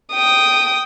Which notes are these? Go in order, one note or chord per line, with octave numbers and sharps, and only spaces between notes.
G5 D#6